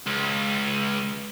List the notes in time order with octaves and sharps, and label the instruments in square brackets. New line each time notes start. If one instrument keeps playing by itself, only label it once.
[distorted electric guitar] C#2